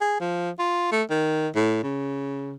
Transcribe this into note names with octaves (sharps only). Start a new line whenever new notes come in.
G#4
F3
F4
A3
D#3
A2
C#3